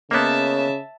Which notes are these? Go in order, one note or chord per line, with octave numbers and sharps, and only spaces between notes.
C#3 A#3 B3 C#5 D#5 E5 A5